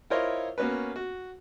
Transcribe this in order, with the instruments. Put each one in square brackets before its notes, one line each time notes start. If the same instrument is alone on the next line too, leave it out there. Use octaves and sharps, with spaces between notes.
[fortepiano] E4 F4 A#4 C5 C#5 D#5
A#3 B3 C#4 F#4 B4
F#4